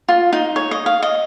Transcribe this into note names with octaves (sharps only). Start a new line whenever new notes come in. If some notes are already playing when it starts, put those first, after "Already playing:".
F4
D#4
C#5
D#5
F5
D#5